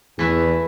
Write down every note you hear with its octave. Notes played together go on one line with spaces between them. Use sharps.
E2 E3 A3 E4 B4 E5